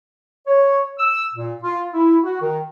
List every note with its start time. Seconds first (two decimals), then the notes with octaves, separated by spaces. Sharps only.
0.47 C#5
0.98 E6
1.34 A#2
1.62 F4
1.93 E4
2.23 F#4
2.41 D#3